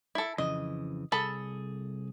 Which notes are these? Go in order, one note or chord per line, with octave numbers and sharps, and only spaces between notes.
E4 A4
F2 C#3 E3 D#5
C2 G#4 A4 A5 B5